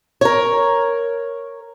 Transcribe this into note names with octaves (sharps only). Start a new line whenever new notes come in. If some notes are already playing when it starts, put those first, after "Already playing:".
A#4 C#5